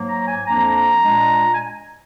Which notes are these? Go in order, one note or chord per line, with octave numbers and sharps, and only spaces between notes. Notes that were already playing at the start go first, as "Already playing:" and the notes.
Already playing: G#2 F#3 A#3
A#5
G#5
F2 F3 A#3 D4 A#5
A#2 G#3 D4
G#5